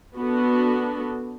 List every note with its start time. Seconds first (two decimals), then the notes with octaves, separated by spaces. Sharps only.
0.16 B3 D4 F#4 A4